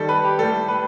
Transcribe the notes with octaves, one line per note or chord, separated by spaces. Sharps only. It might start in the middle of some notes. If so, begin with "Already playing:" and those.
Already playing: D#3 G3 A4
B4
G4
A2 G3 A4
B4